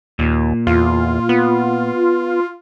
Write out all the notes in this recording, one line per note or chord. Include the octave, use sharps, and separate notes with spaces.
D#2 A#2
E2 F4
B3